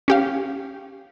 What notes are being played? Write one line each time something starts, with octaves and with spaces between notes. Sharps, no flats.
C#4 G4 F5